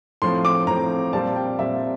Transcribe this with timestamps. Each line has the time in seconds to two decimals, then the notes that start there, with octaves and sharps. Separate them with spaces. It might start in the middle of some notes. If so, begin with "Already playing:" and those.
0.22 A2 F3 C4 C6
0.45 D6
0.67 A2 F3 C4 A#5
1.13 A#2 G3 C4 A5
1.36 G5
1.59 A#2 G3 C4 E5